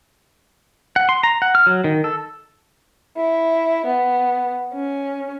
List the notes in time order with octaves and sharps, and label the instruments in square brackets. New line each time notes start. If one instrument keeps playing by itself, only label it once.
[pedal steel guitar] F#5
C6
A#5
F#5
F6
F#3
D#3
A4
[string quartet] E4
B3
C#4